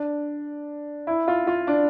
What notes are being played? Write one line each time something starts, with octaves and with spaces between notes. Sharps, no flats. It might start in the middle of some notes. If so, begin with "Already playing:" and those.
Already playing: D4
E4
F4
F4
D4